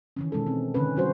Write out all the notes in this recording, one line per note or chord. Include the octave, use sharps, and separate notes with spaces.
D#3 E3 C#4
B2 G#3 C#4 A4
C4
D3 D#3 C#4 B4
E3 G3 F#4 C5